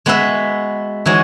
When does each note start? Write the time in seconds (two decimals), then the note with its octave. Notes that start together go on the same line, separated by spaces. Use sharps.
0.06 G#3 B3 F#4 B4 E5
1.06 E3 G#3 D#4 F#4 C#5